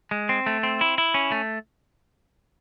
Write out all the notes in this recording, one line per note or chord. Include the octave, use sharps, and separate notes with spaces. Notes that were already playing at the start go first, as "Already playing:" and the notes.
G#3
C4
A3
C4
E4
E4
C#4
A3